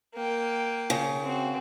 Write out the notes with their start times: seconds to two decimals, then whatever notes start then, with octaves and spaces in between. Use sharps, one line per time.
0.14 A#3 G5
0.90 C#3
1.24 C4 F#4